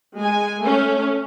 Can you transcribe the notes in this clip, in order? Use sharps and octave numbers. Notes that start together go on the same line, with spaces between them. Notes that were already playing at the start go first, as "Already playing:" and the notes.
G#3 G#5
A3 C#4